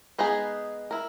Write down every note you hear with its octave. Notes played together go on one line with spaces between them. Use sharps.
G#3 B3 D#4 G#4 B4
E4 A#4